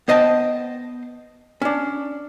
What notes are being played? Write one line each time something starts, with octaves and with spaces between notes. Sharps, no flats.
B3 C5 D#5 G5 A5
C#4 D4